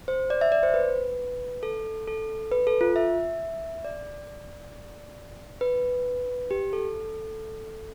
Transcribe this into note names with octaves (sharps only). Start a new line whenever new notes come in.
C5
D5
E5
D5
C5
B4
A4
A4
B4
A4
F4
E5
D5
B4
G4
A4